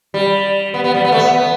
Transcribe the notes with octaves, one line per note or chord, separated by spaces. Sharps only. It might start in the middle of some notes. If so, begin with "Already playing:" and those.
G3
B3
B3
G3
B3
A3
B3
B3